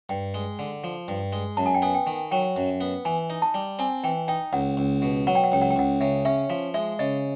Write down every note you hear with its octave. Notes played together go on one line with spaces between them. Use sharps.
G2 G5
G#3
D3
F3
G2
G#3
F#2 A5
G#5
G5
B3 G#5
G5
D#3
F#3 G5
F#2
B3
E3 G#5
D#4
A5
G3
C4 G#5
E3 G5
D#4 G5
C#2 F#5
C#2
B2
F#3 F#5
G5
F#5
C#2 G5
F#5
G5
C#2 F#5
C#3 E5
C#4 E5
F3 F5
G#3 E5
C#3 D#5